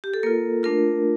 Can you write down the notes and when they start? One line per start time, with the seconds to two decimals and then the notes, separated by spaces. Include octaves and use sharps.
0.04 G4
0.14 A4
0.23 A#3 F4 A#4
0.63 A3 D4 F4 A#4